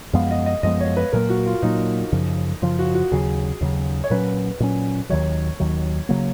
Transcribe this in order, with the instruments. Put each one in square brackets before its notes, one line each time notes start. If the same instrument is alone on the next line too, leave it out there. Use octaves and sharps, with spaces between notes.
[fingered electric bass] F#2 F3 G#3 B3 [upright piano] F5
[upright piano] D#5
D#5
[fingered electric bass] F#2 F3 G#3 B3 [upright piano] D#5
[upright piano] C#5
B4
[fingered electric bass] A#2 F#3 A#3 [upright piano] A#4
[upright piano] F#4
F4
[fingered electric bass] A#2 F#3 A#3 [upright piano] D#4
[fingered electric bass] F#2 C#3 F3
[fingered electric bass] F#2 C#3 F3 [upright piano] F4
[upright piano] F#4
F#4
[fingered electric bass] D#2 C#3 F#3 [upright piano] G#4
[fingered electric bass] D#2 C#3 F#3
[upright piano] C#5
[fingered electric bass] A#2 F#3 C#4 [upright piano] B4
[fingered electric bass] A#2 F#3 C#4
[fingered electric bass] D#2 D#3 F#3 [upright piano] C#5
[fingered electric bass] D#2 D#3 F#3
C#3 F#3 A#3